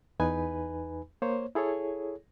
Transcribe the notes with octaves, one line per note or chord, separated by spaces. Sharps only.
E2 D#4 B4 G#5 B5
A#3 C5 C#5
E4 G#4 A4 C#5